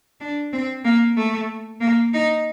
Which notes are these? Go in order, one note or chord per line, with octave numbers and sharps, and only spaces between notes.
D4
C4
A#3
A3
A#3
D#4